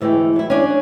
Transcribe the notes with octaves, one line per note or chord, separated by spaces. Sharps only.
D2 E3 G#3 A3 G5
F#3 E4
C#4 D4